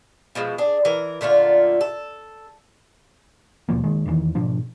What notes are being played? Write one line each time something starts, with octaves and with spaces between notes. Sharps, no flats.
B2 F3 G#3
D4 G#4
E3 A#4
A#2 D3 A3 F4
A4
D#2 B2 F3 A#3
F#1 D#3 G#3
F1 E2 D#3 E3
G#2 B2 F3 D4